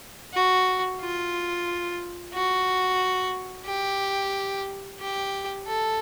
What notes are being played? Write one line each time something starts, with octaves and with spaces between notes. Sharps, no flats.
F#4
F4
F#4
G4
G4
A4